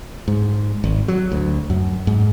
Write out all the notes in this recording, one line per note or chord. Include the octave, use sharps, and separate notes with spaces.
G#2
G#1
F#3
D2
F#2
G#2